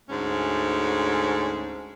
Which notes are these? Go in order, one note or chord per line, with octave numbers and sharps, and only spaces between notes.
D2 G#2 A3 C#4